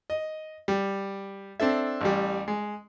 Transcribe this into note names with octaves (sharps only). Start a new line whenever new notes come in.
D#5
G3
C4 D4 A4 E5
A1 G3
G#3